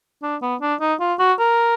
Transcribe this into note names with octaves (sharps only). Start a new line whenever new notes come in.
D4
B3
D4
D#4
F4
F#4
A#4